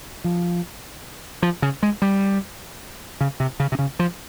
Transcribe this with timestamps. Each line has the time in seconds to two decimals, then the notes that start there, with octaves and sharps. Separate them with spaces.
0.24 F3
1.43 F3
1.62 C#3
1.83 G#3
2.02 G3
3.21 C#3
3.40 C3
3.60 C#3
3.72 C3
3.79 C#3
3.99 F3